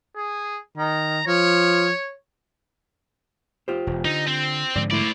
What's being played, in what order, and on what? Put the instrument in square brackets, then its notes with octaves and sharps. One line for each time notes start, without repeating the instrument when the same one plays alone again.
[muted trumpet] G#4
[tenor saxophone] D#3 [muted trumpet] A#5
[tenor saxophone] F3 [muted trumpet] C#5
[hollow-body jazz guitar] F4 G4 C5
[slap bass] E1
[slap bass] D3 [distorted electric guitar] D#4
[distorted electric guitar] C4
[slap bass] G#2 D3 F3 [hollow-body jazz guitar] D5
[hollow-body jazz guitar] A3 E4 B5 [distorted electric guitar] C5 D5